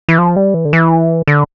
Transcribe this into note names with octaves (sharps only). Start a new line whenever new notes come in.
E3
F3
G3
E3
D3
E3
D3